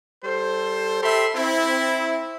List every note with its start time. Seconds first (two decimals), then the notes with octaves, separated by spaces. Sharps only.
0.23 G3 A4 C5
1.03 G4 A4 E5 B5 C6
1.35 C4 E4